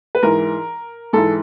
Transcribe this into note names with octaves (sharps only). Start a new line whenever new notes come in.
B4
G#2 E3 A#4
G#2 E3 A4